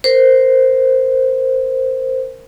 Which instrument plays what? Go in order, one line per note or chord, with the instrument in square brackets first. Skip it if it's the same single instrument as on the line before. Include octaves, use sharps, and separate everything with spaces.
[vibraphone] A#4 C5